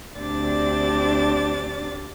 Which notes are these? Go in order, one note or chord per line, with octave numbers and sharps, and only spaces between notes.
D2 C4 D4 G4 D5 A6